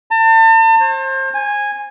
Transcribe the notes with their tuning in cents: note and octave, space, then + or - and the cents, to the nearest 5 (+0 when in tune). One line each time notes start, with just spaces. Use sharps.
A5 +40
C5 +30
G#5 -10